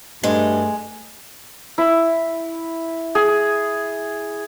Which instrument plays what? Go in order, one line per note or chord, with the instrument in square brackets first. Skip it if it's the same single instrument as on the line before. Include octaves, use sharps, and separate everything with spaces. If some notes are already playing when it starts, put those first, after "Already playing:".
[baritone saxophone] G2 [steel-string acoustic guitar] G#3 [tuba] A3
[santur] E4
G#4